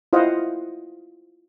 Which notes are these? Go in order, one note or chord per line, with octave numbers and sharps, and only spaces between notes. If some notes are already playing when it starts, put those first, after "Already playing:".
E4 F4 C5 D#5 F5 F#5